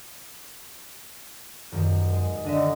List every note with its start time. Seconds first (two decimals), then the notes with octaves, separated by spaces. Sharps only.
1.72 D#1 F#2 D#3
2.13 G#3
2.44 D3 D4 D#5 E5